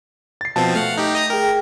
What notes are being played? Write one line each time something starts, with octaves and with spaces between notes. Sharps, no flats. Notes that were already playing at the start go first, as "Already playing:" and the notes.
A6 C7
B2 F3 C4 A5
A3 F5 F#5
D#4 G4
D#5 A#5 D#6
G#4 A#4 G5